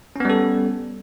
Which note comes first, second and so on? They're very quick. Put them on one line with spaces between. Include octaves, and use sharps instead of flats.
C#4 B3 G3 A4